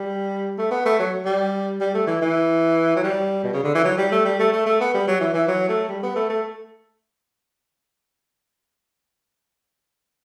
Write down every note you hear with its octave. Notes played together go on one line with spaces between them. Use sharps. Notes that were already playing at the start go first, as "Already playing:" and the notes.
Already playing: G3
A3
B3
A3
F#3
G3
G3
A3
E3
E3
F#3
G3
B2
C#3
D3
E3
F#3
G3
A3
G3
A3
A3
A3
B3
G3
F#3
E3
E3
F#3
A3
G3
B3
A3
A3